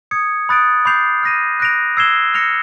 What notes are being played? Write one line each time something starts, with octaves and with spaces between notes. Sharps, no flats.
D#6 G#6 C#7
B5 D#6 F#6 A6 D7
B5 D6 G6 C7 F7
F6 A#6 D#7
F#6 A#6 D7 F7
E6 G#6 C7 E7 G7
F6 A#6 C#7 F7